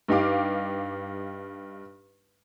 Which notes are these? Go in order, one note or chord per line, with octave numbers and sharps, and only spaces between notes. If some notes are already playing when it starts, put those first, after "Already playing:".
G2 D#4 G4 F5 D6